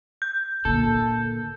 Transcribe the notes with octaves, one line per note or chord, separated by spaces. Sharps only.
G6
A#2 D3 A4